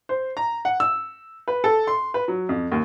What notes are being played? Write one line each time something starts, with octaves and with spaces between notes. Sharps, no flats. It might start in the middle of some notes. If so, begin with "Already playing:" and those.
C5
A#5
F#5
E6
B4
A4
C6
B4
F#3
F2
D#2